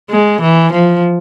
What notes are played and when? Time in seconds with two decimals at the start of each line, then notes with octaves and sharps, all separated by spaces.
0.11 G#3
0.41 E3
0.73 F3